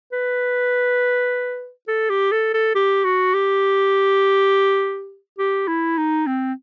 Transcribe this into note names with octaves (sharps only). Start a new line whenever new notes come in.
B4
A4
G4
A4
A4
G4
F#4
G4
G4
E4
D#4
C4